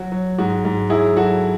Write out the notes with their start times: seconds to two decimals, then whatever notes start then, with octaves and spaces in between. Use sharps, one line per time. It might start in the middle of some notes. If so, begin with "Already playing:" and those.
Already playing: F#3 F#4
0.12 F#3
0.38 G#2 F#4
0.65 G#2
0.90 F#3 E4 G#4
1.16 F#3 F#4 A4